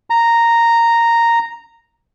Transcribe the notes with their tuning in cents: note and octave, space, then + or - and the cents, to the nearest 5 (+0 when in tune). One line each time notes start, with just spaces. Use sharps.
A#5 -5